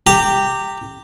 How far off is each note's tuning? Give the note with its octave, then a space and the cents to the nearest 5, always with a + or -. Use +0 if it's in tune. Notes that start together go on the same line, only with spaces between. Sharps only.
G4 +0 A#5 -25